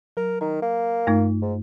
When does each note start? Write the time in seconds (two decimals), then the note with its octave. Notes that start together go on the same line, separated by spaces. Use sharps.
0.17 F#3 A#4
0.41 D#3 A#5
0.62 A#3
1.07 G2 A3 D#4
1.42 G#2